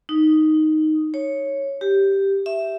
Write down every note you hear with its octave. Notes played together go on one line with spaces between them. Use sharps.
D#4
C#5
G4
E5